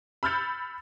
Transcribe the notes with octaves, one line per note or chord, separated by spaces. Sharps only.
B5 E6 F6 G6 A6 C#7